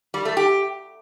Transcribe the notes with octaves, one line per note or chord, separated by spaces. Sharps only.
G3
A3
G4